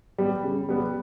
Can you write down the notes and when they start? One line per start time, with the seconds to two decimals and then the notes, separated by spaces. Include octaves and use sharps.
0.18 G3 B3
0.44 C#3
0.69 G3 B3